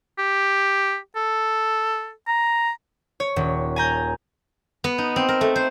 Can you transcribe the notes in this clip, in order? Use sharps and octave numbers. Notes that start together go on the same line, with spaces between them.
G4
A4
A#5
C#5
D#1
G#5 A#5 G6
B3
D#4
C4
A#4
A3
C5